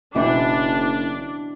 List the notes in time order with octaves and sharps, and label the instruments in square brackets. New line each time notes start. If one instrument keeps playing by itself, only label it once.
[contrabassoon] F#1 [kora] B2 E3 C4 [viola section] D4